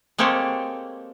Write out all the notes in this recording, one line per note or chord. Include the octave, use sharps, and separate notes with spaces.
G#3 A#3 C4 G4 A4 C#5